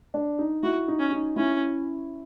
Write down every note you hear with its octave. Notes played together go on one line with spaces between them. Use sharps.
D4
D#4
E4 F#4
D#4
C#4
D#4
C#4 E4